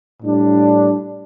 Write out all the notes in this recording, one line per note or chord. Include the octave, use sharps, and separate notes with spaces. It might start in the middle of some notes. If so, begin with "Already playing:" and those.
A2 G3 D4